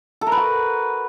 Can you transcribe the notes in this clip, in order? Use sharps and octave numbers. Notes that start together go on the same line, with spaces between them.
A4
A#4
B4
F#4